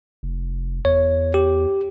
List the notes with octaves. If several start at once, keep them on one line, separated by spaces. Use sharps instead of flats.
F1
E2 C#5
G4